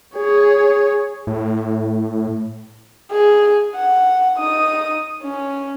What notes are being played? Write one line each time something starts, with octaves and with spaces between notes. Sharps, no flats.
G#4 C#5
A2
G#4
F#5
D#4 D#6
C#4